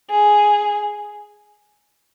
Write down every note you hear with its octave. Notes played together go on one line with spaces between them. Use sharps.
G#4